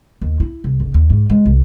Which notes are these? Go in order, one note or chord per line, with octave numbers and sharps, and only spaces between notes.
D#2
E4
C2
F#1
D#2
G#2
G#3
C2